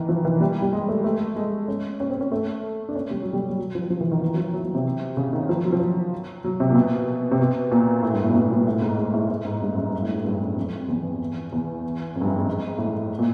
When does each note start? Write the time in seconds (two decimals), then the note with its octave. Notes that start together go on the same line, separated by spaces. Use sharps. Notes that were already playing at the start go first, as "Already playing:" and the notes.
Already playing: D#3 E3
0.09 F3
0.25 E3
0.41 G3
0.62 G3
0.73 G#3
0.89 A3
1.04 A3
1.36 G#3
1.68 C#4
2.00 C#4
2.10 C4
2.21 C#4
2.32 A3
2.89 D4
2.95 C#4
3.11 G3
3.22 F#3
3.33 G3
3.50 G3
3.58 F#3
3.75 F3
3.90 F3
4.01 E3
4.11 D#3
4.22 E3
4.33 F#3
4.37 F3
4.53 F#3
4.64 F#3
4.75 C3
5.17 C#3
5.33 D#3
5.49 F3
5.65 F#3
5.72 F3
5.80 F#3
6.44 F#3
6.60 C3
6.70 A#2
6.76 B2
7.31 C3
7.40 B2
7.71 A#2
8.03 A2
8.13 G2
8.24 A2
8.30 A#2
8.35 B2
8.51 A#2
8.67 A2
8.82 G#2
8.98 G#2
9.13 A2
9.30 A2
9.45 G#2
9.61 G2
9.74 F#2
9.88 G2
10.02 A2
10.14 G#2
10.24 G2
10.41 F#2
10.56 F2
10.89 E2
11.52 E2
12.16 F2
12.21 G2
12.25 F#2
12.36 G#2
12.78 A2
13.19 A#2